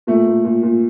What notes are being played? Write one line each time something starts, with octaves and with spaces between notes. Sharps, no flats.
A#2 A3
A#2
A#2
A#2